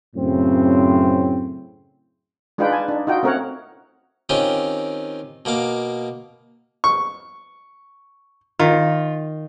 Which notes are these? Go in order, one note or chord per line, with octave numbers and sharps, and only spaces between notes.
F#2 A2 C#3 C4
G#3 D4 D#4 F4 B4 G5
G#5 A5
D4 D#4
D#4 F4 F#4 G5
A3 C4 C#4 A#4 C#5 F#5
D#3 C4 C#4 F4 G4
B2 A#3 F5 D6
C#6
D#3 F4